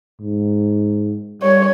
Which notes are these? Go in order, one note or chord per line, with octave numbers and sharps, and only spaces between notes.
G#2
G3 C#5